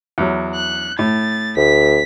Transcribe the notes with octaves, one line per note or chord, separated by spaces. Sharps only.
E2 F#3
F#6
A2 A6
D2 B6